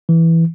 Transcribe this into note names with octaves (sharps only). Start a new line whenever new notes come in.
E3